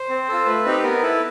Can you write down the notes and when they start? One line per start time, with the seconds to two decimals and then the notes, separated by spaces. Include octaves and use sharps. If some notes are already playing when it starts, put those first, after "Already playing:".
Already playing: C5
0.09 C4
0.28 F4 A4
0.46 A3 B4
0.65 C4 D#4 G4
0.83 B3 A#4
1.02 E4 A4 B4